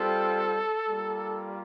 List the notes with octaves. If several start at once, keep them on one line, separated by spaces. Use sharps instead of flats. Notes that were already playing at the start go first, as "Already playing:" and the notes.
Already playing: G3 C4 F4 A4
G3 A#3 F4